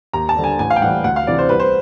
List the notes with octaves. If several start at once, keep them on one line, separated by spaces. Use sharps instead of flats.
D#2 A#5
A5
D3 G3
G#5
A1 G#5
F5
G5
A2 E3 G3 F#5
D2 F#5
F5
C3 E3 D5
C5
C2 B4
C5